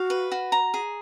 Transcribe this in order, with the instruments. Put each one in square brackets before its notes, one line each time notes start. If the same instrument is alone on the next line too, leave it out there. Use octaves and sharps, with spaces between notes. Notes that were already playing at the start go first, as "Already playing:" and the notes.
Already playing: [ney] F#4 [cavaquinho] F5
[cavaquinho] B4
F#4
A#5
G#4